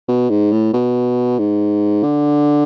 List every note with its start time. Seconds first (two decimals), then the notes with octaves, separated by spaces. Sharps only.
0.08 B2
0.30 G#2
0.52 A2
0.73 B2
1.39 G#2
2.03 D3